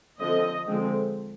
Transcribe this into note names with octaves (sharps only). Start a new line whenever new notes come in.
D3 F3 C4 D#5
D3 F3 G#3 C4